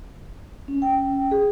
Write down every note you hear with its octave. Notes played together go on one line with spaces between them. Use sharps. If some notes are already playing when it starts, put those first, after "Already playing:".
C#4
G5
G#4